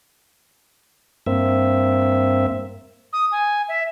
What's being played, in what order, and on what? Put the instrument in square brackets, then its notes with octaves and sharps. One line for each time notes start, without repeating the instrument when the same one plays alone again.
[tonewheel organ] G2 A#3 C4 E5
[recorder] D#6
G#5
E5